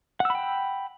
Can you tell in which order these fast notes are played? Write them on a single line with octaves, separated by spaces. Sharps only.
F#5 E6 B5 G5